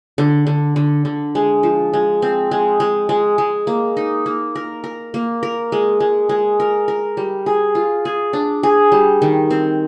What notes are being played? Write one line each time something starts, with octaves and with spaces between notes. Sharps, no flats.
D3
D3
D3
D3
G#3
F3
G#3
C4
G#3
G#3
G#3
G#3
A#3
D#4
A#3
A#4
A#4
A#3
A#4
G#3
G#3
G#3
A#4
A#4
G3
G#4
F4
G#4
D4
G#4
G3
D#3
C4